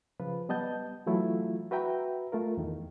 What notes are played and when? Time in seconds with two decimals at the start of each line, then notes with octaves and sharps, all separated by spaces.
0.20 C#3 F3 F4 B4
0.49 G3 B3 D#5 A5 G6
1.06 E3 F#3 A3 E4 F4
1.71 F#4 B4 E5 G5 A#5
2.32 A3 F4 A#4
2.57 E2 D#3